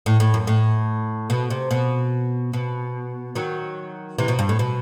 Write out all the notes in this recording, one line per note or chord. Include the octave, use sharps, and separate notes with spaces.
A2
A2
F#2
A2
B2
C3
B2
B2
D#3 F#3
C3 E3
B2
G2
A2
B2